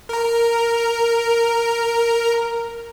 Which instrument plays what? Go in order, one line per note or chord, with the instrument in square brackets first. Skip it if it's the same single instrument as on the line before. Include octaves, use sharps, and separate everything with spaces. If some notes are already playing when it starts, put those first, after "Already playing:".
[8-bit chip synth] A#4 A#5